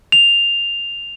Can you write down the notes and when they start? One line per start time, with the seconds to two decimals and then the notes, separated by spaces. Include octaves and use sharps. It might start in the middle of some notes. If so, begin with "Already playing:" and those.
0.12 F7